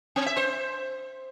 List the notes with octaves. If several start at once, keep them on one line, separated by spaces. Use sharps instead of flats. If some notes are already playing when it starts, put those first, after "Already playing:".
C4
E5
C5